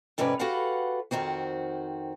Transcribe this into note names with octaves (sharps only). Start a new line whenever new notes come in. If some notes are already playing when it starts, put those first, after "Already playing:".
F2 G#2 C3 C#4 B4 D5
F#4 G4 A4 B4 F5 F#5
F2 G#2 D#3 C4 F#4